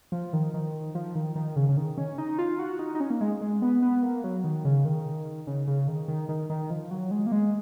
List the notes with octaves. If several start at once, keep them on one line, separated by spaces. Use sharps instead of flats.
F3
D#3
D#3
F3
D#3
D#3
C#3
C#3
D#3
C#4
D#4
F4
F#4
D#4
D#4
C#4
A#3
G#3
G#3
B3
B3
A#3
F#3
D#3
C#3
D#3
C#3
C#3
D#3
D#3
D#3
D#3
F3
F#3
G#3
A#3
G#3